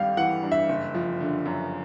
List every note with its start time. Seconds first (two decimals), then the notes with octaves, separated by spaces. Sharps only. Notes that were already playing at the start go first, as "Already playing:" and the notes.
Already playing: G#1 G2 G3 F5
0.17 E3 F#5
0.43 G2
0.52 E5
0.69 F#1
0.94 F3
1.20 D3
1.45 F#2